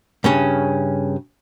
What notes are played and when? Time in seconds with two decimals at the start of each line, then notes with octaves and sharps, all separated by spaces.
0.24 G2 C#3 C#4